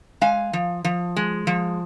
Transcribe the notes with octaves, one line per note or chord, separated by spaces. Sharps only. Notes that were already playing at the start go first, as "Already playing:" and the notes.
G#3 F5 G#5
F3
F3
G#3
F3